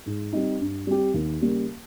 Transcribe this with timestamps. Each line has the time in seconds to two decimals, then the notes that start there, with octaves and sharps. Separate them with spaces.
0.06 G#2
0.33 G3 C4 D#4
0.60 G2
0.87 G3 C4 G4
1.14 D#2
1.41 C#3 G3 A#3